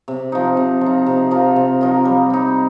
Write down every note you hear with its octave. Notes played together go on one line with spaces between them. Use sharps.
C3
F3 D#4
C3
F3 D#4
C3
F3 D#4 A#4
C3
F3 D#4 A#4
G3
C4 D#4